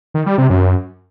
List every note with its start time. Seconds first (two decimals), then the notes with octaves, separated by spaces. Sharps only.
0.14 D#3
0.26 G3
0.38 C3
0.50 F#2